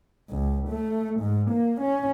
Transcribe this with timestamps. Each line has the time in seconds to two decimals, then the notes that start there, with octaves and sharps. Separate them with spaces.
0.30 C#2
0.69 A3
1.21 G#2
1.51 A#3
1.81 C#4